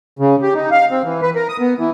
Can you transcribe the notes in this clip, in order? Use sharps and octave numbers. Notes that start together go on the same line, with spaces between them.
C#3
G4
D#4
F5
C4
E3
B4
A#4
D#6
B3
E3